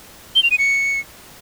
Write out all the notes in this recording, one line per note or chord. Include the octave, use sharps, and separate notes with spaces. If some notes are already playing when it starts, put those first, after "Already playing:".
G7
F7
D#7
C#7